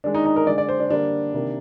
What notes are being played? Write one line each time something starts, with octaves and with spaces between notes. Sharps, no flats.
D#3 G#3 D4
D#4
D#4
A#4
D3 G#3 D5
D5
C5
D4
D3 G3 A#3 D4
C3 D#3 A#3